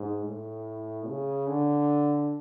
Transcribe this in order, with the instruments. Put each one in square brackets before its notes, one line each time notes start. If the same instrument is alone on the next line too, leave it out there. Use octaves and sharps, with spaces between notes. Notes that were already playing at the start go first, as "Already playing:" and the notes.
Already playing: [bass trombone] G#2
A2
C#3
D3